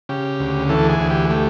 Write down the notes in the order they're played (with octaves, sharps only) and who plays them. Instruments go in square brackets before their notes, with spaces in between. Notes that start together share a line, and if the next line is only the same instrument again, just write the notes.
[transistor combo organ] C#3 G4
D2
E3 A4
G#4
D2
G4
A3 G4